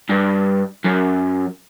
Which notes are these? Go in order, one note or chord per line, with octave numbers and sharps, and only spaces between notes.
G2
F#2